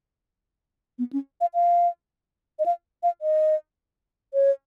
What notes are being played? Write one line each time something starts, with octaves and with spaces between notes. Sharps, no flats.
B3
C#4
F5
F5
D#5
F5
F5
D#5
C#5